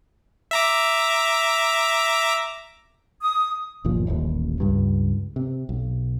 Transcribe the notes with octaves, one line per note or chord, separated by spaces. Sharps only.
E5 A#5 D6
D#6
G1 D#2 A#2 F3
D#1 A1 D#2
C#2 G2
C3
B1